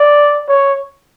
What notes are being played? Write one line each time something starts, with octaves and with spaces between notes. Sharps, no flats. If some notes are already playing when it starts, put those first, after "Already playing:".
Already playing: D5
C#5